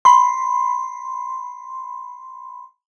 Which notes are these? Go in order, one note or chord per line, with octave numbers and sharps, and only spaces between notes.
B5 C6